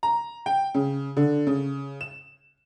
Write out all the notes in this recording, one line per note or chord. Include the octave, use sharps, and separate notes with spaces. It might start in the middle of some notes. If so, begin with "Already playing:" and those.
A#5
G5
C#3
D3
C#3
E7